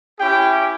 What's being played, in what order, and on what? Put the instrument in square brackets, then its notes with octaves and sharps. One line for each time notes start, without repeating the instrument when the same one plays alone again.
[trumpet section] C#4 E4 G4 G5